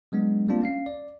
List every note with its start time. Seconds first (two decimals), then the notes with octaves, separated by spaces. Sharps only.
0.12 F#3 G#3 B3 D4
0.48 G3 A#3 C4 D4 F4
0.62 C#4 F5 C7
0.86 D5